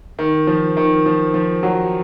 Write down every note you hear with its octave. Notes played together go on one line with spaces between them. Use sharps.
D#3
F3
D#3
F3
F3
F#3